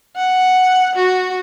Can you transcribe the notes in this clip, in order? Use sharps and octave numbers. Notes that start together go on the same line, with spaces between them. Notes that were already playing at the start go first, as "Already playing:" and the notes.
F#5
F#4